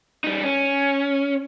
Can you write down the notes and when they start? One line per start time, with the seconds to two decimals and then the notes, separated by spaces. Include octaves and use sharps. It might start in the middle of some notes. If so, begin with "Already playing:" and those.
0.24 G3 D#4
0.43 C#4